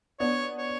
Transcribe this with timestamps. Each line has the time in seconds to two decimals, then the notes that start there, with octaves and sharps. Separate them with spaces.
0.19 B3 D4 C#5
0.58 C#5